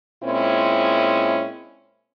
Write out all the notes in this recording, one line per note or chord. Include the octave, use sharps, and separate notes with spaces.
A#2 G#3 C4 C#4 E4